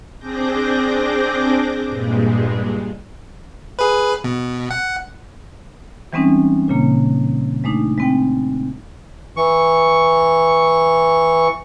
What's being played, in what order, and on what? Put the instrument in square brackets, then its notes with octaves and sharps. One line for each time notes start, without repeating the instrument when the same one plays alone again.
[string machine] C4 D4 G#4 D6 G6 A#6
G2 A#2 G#3
[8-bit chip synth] G#4 B4
B2
F#5
[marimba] E3 G3 G#3 C4 C#4 D#4
A#2 C#3 A#3
G#3 A3 D4 D#4
G#3 C4 G5
[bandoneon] E3 C#6